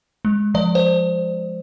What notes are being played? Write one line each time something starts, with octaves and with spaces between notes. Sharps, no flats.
G#3
F3 D5
C5